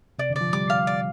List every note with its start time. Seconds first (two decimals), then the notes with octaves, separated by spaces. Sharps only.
0.19 C3 D5
0.30 D3
0.36 D5
0.41 F3
0.53 G3 D6
0.70 F5
0.87 D5